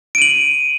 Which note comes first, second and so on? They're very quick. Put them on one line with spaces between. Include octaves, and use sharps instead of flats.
D7 D#7 F#7